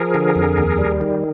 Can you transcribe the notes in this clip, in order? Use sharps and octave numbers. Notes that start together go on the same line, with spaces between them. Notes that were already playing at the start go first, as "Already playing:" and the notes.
Already playing: F3 G#4 A#4
D3
F2
D#2
G3
D#3